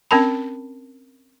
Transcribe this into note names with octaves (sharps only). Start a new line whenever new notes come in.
C4 C#4 A#4 A5 B5